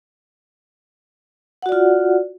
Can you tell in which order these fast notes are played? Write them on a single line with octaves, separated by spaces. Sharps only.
F#5 F#4 D5 F4